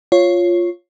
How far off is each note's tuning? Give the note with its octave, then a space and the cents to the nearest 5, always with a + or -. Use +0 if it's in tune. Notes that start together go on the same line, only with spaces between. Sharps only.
F4 +0 C#5 -5